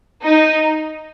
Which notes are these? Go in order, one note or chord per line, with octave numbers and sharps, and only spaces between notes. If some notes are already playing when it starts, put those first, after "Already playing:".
D#4